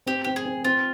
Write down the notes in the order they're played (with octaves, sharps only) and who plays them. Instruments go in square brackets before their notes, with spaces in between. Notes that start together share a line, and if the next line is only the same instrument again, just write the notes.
[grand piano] C4 [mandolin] G4
[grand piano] C4 [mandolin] G4
[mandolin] G#4
[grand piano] C4
[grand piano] C4 [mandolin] F4